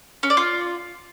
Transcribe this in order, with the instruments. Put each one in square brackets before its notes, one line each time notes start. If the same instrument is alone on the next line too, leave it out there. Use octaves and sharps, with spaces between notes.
[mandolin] C#4
D5
F4